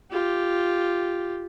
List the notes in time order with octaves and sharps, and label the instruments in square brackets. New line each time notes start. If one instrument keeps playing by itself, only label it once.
[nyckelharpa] F4 G4